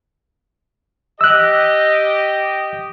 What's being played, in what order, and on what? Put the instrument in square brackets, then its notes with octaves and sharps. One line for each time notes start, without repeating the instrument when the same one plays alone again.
[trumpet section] G4 D#5 [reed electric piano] E6 F#6